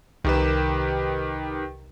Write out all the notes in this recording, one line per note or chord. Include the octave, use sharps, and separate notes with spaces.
C2 D#3 G4 A#4 B4 E7